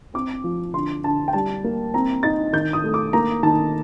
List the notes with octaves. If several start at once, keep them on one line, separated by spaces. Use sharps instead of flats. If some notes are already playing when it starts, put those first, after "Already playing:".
C4 D6
F3
D3 C6
D3 A5
G5
G3 A5
A#3
C4 A#5
D#4 A6
D#3 G6
D#6
A3
D6
A#3 A#5
D#3 A5